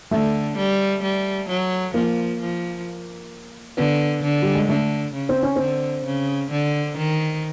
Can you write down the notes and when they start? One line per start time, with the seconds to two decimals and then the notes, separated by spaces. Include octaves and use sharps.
0.11 D3 A3
0.58 G3
1.03 G3
1.49 F#3
1.94 F3 A#3
2.40 F3
3.77 D3 B3
4.23 D3
4.42 G3
4.55 G#3
4.69 D3 A3
5.14 C#3
5.29 C4
5.43 C#4
5.56 D3 C4
6.05 C#3
6.51 D3
6.98 D#3